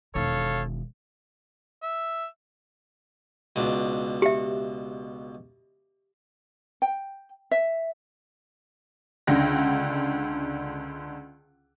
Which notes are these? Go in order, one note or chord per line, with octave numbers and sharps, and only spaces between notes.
E1 D#3 A4 C#5 F5
E5
C#2 B2 D4
G4 E5
G5
E5
C#2 D3 A#6